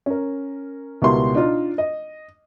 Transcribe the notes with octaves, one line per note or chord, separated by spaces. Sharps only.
C#4 A#4
C#2 B2 G3 E4 A#4 C6
D4 D#4 F4
D#5